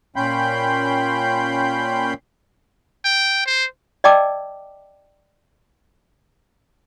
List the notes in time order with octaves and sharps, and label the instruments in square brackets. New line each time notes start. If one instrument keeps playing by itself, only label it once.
[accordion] A#2 C#4 G5 B5 C6 G6
[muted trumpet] G5
C5
[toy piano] D5 D#5 G5 A5 D6 E6